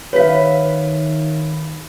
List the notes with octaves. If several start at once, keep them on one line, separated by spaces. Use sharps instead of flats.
D#3 B4 C#5 E5 F5 B6